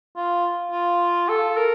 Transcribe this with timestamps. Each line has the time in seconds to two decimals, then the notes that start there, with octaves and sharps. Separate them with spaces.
0.17 F4
0.72 F4
1.29 A4
1.57 A#4